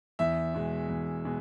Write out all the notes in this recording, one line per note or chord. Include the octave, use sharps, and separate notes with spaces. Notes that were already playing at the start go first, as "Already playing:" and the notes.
E2 E5
B2 G#3
E2
B2 G#3